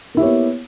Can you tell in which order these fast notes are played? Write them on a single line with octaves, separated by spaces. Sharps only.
A#3 E4 G4 C#5 B3